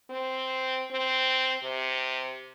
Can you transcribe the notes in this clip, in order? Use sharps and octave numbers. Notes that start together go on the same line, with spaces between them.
C4
C4
C3